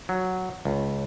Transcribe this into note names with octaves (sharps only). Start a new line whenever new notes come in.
F#3
C#2